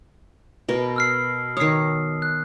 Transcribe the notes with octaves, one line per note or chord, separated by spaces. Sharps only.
B2 A#4
E6 F6 C7
D#3 C#5 D#6 C7
F#6